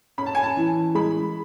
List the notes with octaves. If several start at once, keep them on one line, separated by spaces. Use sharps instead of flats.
C#4 B5
A5
G#5
A5
E3
G#3 B5